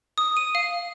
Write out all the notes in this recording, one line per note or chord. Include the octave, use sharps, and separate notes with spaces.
D#6
D#7
F5